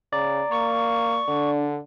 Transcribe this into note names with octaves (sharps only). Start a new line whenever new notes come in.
C#3 D5 A#5
A#3 C#6
D3 D4